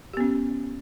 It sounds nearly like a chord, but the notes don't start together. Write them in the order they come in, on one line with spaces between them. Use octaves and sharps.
G4 B3 C#4